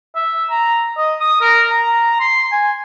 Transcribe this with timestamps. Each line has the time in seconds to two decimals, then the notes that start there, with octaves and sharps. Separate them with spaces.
0.16 E5
0.50 A#5
0.97 D#5
1.21 D#6
1.41 A#4
1.71 A#5
2.20 C6
2.52 G#5